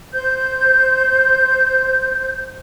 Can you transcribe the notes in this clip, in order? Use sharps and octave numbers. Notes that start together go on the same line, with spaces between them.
C5 G6